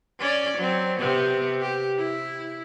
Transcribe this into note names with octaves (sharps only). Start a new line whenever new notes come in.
C#4 D5
F#3 C4
C3 B3 C4
G4
E4